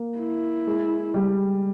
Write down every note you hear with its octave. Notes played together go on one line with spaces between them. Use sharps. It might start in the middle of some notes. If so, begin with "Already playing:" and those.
Already playing: A#3
E4
G#3
G3